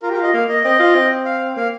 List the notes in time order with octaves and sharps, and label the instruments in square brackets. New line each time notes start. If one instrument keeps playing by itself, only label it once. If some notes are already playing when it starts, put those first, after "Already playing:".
[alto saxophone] F4 [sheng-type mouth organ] A#4
[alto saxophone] G4
[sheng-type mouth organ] A#4
[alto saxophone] F4
[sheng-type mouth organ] D#5
[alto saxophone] A#3 [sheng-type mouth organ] F5
[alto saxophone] A#3 [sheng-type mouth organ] D#5
[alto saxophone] C4 [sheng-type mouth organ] D#5
[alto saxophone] F4
C4
[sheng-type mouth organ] F5
[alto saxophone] A#3 [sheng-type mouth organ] F5